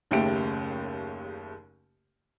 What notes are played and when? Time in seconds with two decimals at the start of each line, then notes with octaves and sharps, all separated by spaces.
0.11 F#1 D#2 C#3 A3 G4 D7